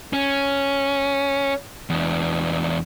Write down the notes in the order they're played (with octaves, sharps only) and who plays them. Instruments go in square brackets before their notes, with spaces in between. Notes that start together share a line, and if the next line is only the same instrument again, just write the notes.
[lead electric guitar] C#4
E2 D4